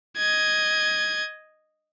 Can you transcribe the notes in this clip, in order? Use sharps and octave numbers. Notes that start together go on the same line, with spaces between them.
D#5 G#6